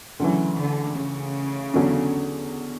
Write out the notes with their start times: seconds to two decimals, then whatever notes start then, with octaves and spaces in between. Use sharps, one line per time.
0.20 D2 C#3 E3 F#3
0.58 D3
0.96 C#3
1.74 E2 D3 F#3 C#4